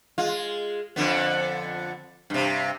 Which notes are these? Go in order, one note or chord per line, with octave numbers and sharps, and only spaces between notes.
G#3 F4
F2 D3 B3
G2 C3